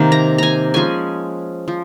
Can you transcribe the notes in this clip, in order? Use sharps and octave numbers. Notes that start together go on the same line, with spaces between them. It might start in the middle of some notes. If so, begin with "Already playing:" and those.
Already playing: C3 D#3 A#3
A#5
G#5 A#5
F3 G#3 C#4 G#5
F3